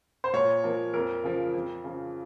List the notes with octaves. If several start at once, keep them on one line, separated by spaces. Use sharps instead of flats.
C5
A#2 C#5
F3 A#3
F2 A#4
C#3 F3
F2
C#3 F3